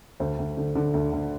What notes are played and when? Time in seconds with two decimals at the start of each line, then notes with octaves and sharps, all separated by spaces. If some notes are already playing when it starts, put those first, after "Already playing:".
0.20 D2 C5
0.38 D2
0.57 D3
0.75 D3
0.94 D2
1.12 D2